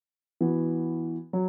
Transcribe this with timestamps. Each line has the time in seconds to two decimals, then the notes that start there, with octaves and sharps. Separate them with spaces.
0.41 E3 B3 F#4
1.33 F#3